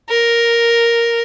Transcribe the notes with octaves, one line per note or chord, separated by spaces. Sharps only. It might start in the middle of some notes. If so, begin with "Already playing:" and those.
A#4